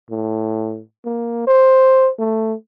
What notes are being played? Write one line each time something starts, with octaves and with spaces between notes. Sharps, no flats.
A2
A#3
C5
A3